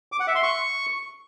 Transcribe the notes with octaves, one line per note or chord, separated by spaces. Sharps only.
D6
F#5
E5
C6
C#6